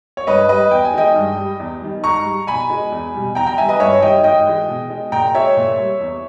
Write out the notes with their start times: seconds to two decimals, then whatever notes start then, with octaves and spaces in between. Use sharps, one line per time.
0.17 C#5
0.27 G2 B4 D#5
0.49 G3 B4 D#5
0.71 E2 G5
0.85 G#5
0.94 D#3 G#3 D#5 G5
1.16 G2
1.37 G3
1.60 E2
1.81 D#3 G3
2.04 G#2 A#5 C#6
2.25 G3
2.47 B2 G#5 B5
2.70 G#3
2.92 E2
3.14 B2 G3
3.35 E2 G5 A#5
3.47 G5 A#5
3.58 D#3 G3 E5 G#5
3.68 B4 D#5
3.80 G2 C#5 E5
4.02 D#3 G3 D#5 G5
4.24 G#2 D#5 G5
4.46 E3 G#3
4.68 B2
4.90 G#3
5.12 A#2 G5 A#5
5.34 G#3 C#5 E5
5.57 A#2
5.78 G3
6.00 E2